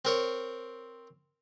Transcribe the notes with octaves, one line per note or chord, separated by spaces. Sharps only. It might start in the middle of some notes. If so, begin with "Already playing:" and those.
C4 A#4 C#5